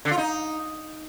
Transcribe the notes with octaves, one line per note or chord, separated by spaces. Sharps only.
D3
F4
D#4